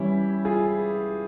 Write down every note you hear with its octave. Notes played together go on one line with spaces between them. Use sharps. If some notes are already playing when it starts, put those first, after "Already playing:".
Already playing: E3 G3 C#4 E4 G4
F4 G#4